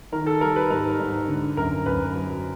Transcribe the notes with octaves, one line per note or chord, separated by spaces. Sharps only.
D#3 A#4
A4
G3 A#4
B4
G#2 A#4
G#2
D3
F#2 A#4
F#2 B4
F#3